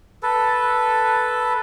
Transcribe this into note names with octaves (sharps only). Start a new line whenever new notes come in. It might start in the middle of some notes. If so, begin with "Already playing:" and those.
A4 B4